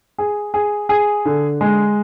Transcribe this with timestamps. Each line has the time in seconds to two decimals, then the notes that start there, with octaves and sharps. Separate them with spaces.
0.18 G#4
0.54 G#4
0.89 G#4
1.25 D3
1.61 G#3